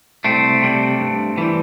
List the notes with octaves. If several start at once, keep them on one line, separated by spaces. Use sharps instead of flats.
C2 A3 C4
C3 G3
G2
E3 G3